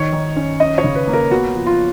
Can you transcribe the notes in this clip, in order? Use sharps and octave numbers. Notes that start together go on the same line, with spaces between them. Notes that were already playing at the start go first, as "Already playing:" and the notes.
Already playing: D#3 C#5
D#3
C#4
C#4 D#5
C#5
C#3
B4
A#3
A#4
B3 F#4
F3
F4